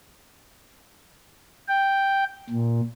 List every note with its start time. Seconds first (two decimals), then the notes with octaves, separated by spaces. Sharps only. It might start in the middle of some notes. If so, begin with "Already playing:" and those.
1.68 G5
2.50 A#2